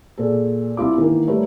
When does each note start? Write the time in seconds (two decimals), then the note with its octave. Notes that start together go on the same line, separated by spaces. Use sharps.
0.18 A#2 G#4 A4
0.77 C2 E4 F4 D6
0.98 D#3 E3 A#3
1.27 G3 A3 A#4 B4 C#5